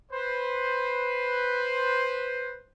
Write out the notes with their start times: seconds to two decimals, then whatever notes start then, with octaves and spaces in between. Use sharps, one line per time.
0.12 B4 C5